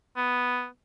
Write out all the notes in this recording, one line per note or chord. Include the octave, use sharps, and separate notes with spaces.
B3